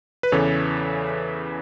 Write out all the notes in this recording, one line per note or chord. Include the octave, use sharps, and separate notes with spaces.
B4
E2 C#3 E3 A4 C#5